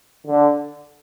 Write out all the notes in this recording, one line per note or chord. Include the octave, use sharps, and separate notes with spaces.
D3